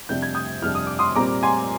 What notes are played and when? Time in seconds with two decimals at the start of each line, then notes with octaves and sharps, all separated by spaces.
0.09 F2 C3 G3 D4 G6
0.22 G#6
0.35 D#6 G6
0.62 F2 C3 G3 D4 F6
0.75 D#6
0.87 D6
0.99 C6 D#6
1.16 A#2 G3 C4 A#5 D6
1.43 G#5 C6